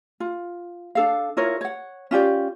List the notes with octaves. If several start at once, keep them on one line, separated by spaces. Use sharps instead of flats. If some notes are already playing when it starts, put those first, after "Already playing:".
F4
D4 A4 F5
E4 F4 A#4 C#5
C#5 F#5
C#4 F4 G4 D5